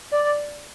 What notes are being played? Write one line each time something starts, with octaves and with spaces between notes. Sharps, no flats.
D5
D5